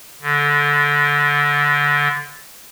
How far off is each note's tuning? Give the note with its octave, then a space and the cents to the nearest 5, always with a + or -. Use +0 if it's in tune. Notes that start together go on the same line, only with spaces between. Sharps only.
D3 -15